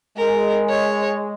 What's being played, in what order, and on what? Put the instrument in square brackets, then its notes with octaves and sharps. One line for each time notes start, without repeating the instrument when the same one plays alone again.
[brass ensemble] G#3 [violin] A#4
[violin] C#5